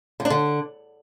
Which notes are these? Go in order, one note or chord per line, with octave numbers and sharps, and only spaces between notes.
D3
D4
D3